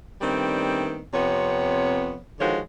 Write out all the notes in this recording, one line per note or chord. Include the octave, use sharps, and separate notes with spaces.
D#3 G3 A3 B3 C4 D4
F2 C3 B3 C#5
D3 D#3 F3 G#3 F#4 C#5